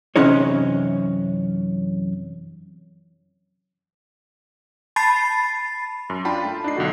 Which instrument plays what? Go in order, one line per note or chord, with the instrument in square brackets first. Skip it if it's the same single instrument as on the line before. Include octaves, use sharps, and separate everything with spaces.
[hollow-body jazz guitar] F#2 C3 E3 C#4 D#4 C#5
[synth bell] A5 B5 A6 C7
[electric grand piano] F#2
D4 F4 G5 A5 B5
A3
D4 D#4 C7
B1 D3 F#4